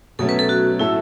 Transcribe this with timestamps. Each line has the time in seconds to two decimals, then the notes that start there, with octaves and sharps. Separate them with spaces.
0.19 B2 F#3 A3 C#4 A4
0.29 B4
0.39 A4
0.49 F#4
0.79 A2 A3 E4 F#4 A4 E5